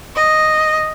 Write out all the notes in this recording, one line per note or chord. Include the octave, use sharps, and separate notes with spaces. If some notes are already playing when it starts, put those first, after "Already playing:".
D#5